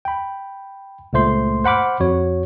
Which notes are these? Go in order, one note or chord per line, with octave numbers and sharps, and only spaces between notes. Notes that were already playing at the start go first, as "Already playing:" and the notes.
G5 B5
C#2 A#2 A3 C5 C6
C5 F#5 B5 D6 F6
F2 F#4 C#5